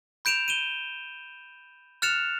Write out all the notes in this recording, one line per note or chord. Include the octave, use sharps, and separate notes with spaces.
B5 G6 D7 E7 F7
D#7 E7 G7
F6 F#6 A6 C#7 E7 F7